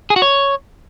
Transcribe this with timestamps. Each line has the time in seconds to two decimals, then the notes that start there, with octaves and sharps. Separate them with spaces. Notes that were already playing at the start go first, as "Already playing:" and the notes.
0.10 G#4
0.16 F#4
0.22 C#5